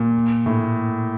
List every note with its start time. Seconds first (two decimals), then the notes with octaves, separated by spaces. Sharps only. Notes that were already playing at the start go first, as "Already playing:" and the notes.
Already playing: A#2
0.46 A2